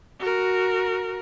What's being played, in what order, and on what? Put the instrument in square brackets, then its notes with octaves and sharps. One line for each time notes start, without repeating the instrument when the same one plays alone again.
[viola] F#4 A#4